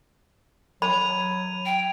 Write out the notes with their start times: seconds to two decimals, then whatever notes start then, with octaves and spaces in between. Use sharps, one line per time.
0.82 F#3 B5 G#6 D#7 F7
1.66 G5